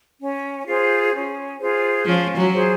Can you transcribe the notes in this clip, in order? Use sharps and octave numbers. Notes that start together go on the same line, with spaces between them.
C#4
F4 G#4 C5
C#4
F4 G#4 C5
F3 C#4
F#3
F4 G#4 C5